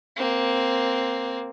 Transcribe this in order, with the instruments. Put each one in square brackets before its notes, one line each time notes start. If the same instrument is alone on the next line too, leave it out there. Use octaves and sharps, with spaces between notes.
[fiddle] A#3 C4